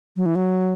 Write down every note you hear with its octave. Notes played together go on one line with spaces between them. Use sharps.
F#3
E3
F#3